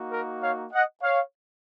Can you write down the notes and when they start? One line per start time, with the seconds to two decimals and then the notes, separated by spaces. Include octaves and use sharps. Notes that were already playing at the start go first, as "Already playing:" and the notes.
Already playing: A#3 D#4 F#4
0.11 A#4
0.42 C#5 F5
0.72 D#5 F#5
1.02 C#5 F5